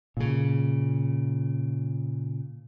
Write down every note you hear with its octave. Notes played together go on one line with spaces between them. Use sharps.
A#2 C#3